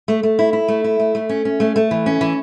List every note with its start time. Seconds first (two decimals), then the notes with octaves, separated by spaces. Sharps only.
0.08 A3
0.23 A3
0.39 E4
0.53 E4
0.68 A3
0.84 E4
1.00 A3
1.15 A3
1.29 C#4
1.45 C#4
1.60 A3
1.76 A3
1.91 E3
2.06 C#4
2.21 E3